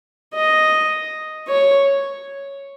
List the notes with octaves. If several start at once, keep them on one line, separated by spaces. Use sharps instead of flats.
D#5
C#5